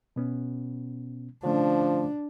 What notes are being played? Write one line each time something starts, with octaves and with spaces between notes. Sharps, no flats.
B2 B3 C#4
D3 F3 A3 C#4 D4